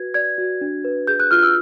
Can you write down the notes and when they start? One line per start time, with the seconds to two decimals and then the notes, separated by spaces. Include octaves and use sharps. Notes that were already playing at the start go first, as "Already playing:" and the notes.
Already playing: F#4 B4 G#6
0.14 D5 G#6
0.38 F#4
0.61 D4
0.85 B4
1.07 G#4 G6
1.20 F#6
1.31 F4 F6
1.43 E6